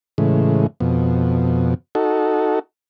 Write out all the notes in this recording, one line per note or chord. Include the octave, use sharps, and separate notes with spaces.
A2 C#3 E3 G#3
F2 B2
D#4 F#4 A4